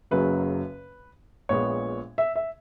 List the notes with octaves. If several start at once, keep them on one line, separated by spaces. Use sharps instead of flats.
F#1 F#2 C#3 F#3 B4
A#1 A#2 G#3 B3 C#5
E5
E5